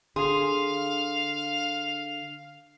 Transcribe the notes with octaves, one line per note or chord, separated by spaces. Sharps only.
D3 G#4 F5 C6